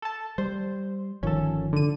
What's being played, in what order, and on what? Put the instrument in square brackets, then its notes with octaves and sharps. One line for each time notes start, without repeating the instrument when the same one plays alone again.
[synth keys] A4 A5
[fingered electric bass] G3 [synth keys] C5
[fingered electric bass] G1 D#3 F3 [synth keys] C#4 A4
[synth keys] D3 D#7